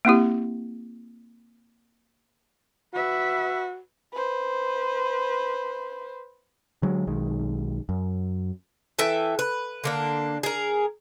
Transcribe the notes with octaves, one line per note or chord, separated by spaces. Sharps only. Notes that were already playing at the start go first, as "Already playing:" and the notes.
A#3 C4 E4 G4
F#4 B4 E5
B4 C5
D3 F#3 G#3
B1 D#3 G#3
F#2
E3 A4 E5 G5
B4
D3 A#3 D4
G#4 A#4